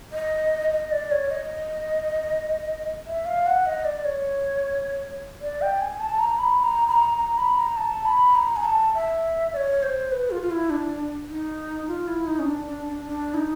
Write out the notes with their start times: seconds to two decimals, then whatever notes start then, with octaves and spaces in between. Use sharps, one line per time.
0.12 D#5
0.72 D#5
0.92 D5
1.11 C#5
1.30 D#5
3.07 E5
3.26 F5
3.46 F#5
3.66 D#5
3.85 D5
4.05 C#5
5.41 D5
5.62 G5
5.81 G#5
6.00 A5
6.19 A#5
6.39 B5
6.60 B5
6.63 A#5
6.88 B5
6.92 A#5
7.18 A#5
7.38 B5
7.57 A#5
7.77 A5
8.05 B5
8.35 A#5
8.56 G#5
8.65 A5
8.95 E5
9.53 D5
9.57 C#5
9.83 C5
10.12 B4
10.31 F4
10.43 F4
10.51 E4
10.70 D4
11.29 D#4
11.88 F4
12.08 E4
12.27 D#4
12.39 C#4
12.46 D4
12.66 D4
12.86 D4
13.05 D4
13.34 E4
13.37 D#4